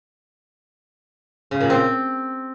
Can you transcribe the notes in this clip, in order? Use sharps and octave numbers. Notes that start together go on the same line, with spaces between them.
C#3
A#2
C4